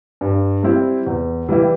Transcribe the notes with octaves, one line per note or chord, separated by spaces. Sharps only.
G2
G3 C4 E4
E2
E3 G3 E4 G4